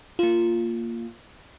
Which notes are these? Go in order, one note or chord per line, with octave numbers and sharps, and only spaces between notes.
A#3 F4